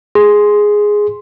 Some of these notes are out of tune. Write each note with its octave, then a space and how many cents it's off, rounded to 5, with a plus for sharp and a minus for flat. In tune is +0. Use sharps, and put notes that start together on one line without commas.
G#4 +0 C6 +0